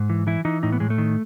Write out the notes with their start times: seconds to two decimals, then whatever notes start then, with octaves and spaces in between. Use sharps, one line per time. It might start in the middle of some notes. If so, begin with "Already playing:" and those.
Already playing: G#2
0.10 E3
0.27 E3 E4
0.45 E3 D#4
0.63 A2 D#4
0.72 B3
0.80 A2 G#3
0.90 A3
0.98 D#3